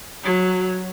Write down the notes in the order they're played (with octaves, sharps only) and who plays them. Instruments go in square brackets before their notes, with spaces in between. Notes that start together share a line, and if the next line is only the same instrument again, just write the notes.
[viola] F#3